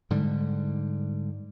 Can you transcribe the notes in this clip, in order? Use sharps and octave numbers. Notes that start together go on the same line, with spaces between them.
G#2 D3 G3